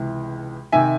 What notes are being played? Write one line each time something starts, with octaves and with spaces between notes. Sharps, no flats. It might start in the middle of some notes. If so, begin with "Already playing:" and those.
Already playing: C#2 C3 E3
C3 D#3 E5 G#5